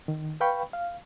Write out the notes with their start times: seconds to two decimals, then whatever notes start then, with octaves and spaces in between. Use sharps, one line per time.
0.08 D#3
0.40 B4 F5 G5 B5 C#6
0.73 F5